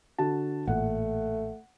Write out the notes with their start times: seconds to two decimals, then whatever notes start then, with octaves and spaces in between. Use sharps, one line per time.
0.18 D3 F#4 A5
0.67 A1 A#2 A3 F#5